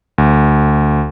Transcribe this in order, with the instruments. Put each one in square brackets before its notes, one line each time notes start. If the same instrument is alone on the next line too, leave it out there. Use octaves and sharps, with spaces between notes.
[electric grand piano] D2